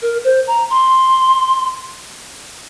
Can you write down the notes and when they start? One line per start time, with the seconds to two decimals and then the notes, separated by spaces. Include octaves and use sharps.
0.02 A#4
0.24 C5
0.47 A#5
0.71 C6